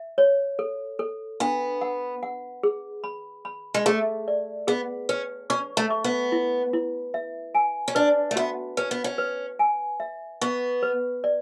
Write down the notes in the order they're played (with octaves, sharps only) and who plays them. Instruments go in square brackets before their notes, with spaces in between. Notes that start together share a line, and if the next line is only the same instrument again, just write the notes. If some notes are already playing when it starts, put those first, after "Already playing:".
Already playing: [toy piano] E5
C#5
A4
A4
[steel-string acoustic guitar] B3 [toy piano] D4
[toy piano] F#5
F#5
G#4
B5
B5
[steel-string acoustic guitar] G#3
[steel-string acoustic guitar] A3 [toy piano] G#4
[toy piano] D5
[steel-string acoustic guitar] B3 [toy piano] G#4
[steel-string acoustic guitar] C#4 [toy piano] B4
[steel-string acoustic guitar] C#4 [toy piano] C#6
[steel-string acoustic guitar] A3
[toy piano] C#6
[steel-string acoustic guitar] B3
[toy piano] E4
E4
E5
G#5
[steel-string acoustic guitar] C#4
[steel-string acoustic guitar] D4 [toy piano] B4
[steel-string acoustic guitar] A3
[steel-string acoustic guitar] B3 [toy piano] F#4
[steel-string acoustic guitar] C#4 [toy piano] B4
[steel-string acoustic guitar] B3
C#4
[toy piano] B4
G#5
E5
[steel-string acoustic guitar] B3 [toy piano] C#6
[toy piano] B4
D5